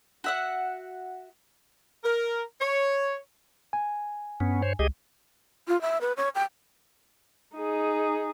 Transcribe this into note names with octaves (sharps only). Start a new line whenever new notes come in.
F#4 E5 F#5
A#4
C#5
G#5
G2 B3 C#4
C5 C#5
C#2 G4 G#4 D#5
F4
E5
B4
C#5
G5
D#4 G#4